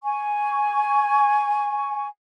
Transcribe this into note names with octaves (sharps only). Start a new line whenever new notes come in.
G#5 C#6